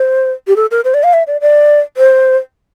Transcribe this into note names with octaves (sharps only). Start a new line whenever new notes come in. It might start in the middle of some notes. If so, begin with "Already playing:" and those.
Already playing: C5
G4
A4
A#4
C5
D5
F5
E5
D5
D5
C5